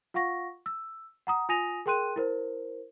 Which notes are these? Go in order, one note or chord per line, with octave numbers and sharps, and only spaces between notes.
F4 F5 F#5 C#6 A#6
E6
F#5 A#5 D#6
F4 G#5 D#6 A#6 D#7 F7
G#4 A#4 G5 C6 F#6 D#7
E4 A#4 C5